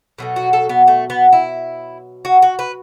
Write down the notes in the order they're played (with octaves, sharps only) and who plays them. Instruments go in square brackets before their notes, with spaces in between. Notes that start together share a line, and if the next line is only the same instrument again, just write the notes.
[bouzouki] B2 F#3 A3
F#4
A4
B3
A3
B3
E4
F#4
F#4
B4